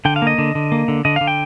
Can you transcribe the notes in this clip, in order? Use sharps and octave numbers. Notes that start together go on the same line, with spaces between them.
D3 G5
F5
A#3 D#5
D3
D3
A#3
D3
D3 D#5
D3 F5
G5